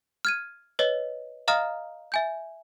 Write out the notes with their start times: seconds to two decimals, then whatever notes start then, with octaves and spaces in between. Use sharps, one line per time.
0.25 F6 G#6 D#7
0.79 B4 C#5 D#5
1.48 D#5 F5 A#5 D#6 F6
2.12 E5 G#5 G6